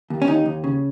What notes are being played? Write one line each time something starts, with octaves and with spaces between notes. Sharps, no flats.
D#2
C#4
D#2 D#4
D#2
C#3